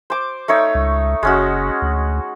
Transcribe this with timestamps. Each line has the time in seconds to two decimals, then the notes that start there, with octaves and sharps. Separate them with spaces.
0.10 C5 D6
0.48 A3 D#4 C#5
0.75 C#2
1.23 F#1 G#3 C#4 F#4
1.82 D2